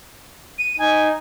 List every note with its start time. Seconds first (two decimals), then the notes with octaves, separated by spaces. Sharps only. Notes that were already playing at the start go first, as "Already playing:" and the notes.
0.59 D#7
0.79 D#4 G#5